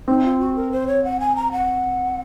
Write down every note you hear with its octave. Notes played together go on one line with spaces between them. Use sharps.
C4 D#4
F4
F#4
A#4
C5
C#5
F#5
G#5
A#5
F#5